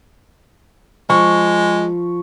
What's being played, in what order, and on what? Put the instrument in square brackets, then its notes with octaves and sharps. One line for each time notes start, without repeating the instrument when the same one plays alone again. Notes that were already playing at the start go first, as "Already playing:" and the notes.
[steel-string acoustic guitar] F3 [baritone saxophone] G#3 [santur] C#6